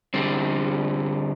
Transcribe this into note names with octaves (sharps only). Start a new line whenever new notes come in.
D3 G3 C4